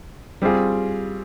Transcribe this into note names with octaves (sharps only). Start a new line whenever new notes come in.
G3 C4 F4 G#4